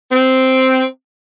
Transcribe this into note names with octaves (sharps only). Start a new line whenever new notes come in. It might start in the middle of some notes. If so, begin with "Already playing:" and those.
C4